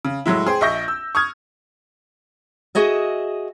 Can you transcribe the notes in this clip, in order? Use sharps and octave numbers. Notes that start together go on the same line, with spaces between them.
C#3
A2 F#3 G#3 E4
G#4 C5 G5
A#1 D#5 E5 C#6 G6 A#6
E6
C#6 D#6 F6 G#6
F#4 G#4 D#5 E5